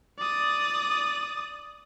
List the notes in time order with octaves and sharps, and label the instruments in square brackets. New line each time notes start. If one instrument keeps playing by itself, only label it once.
[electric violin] D5 D#6